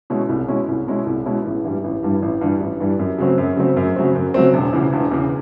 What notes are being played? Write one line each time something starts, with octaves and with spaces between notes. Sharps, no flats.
B2 G#3 C#4 E4
C2
B2 G#3 C#4 E4
C2
B2 G#3 C#4 E4
C2
B2 G#3 C#4 E4
A1
G2 E3 G3
A1
G2 E3 G3
A1
G2 E3 G3
A1
G2 E3 G3
F#2
C#3 F#3 A3 C4
F#2
C#3 F#3 A3 C4
F#2
C#3 F#3 A3 C4
F#2
C#3 F#3 A3 C4
E1
E2 C#3
E1
E2 C#3